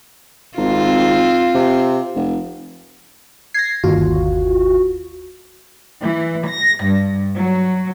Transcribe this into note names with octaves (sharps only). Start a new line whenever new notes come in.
G#1 C4 F4
C3
F1
G#6 A#6 C7
G1 D#2 F4 F#4
E3
A#6
G2
F#3